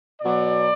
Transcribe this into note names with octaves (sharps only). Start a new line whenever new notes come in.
B2 F#3 D5